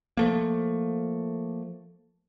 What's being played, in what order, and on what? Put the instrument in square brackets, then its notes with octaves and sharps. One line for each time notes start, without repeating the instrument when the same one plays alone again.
[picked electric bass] F3 A3 A#3